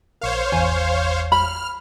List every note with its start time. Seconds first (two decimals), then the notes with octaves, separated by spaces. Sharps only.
0.21 A#1 A#4 C5 C#5 F5
0.52 G#1 E2 G#5
1.32 B5 F6